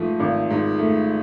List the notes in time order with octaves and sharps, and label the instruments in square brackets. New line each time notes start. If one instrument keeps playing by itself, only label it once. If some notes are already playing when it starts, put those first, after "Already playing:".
Already playing: [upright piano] G#2 F3 A3
G#1
G#2
A3